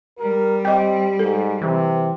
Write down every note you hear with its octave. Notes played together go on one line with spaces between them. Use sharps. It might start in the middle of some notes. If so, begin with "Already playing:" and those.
G3 A#4
C4 G4 D#5 G5
G#2 A4
C3 E3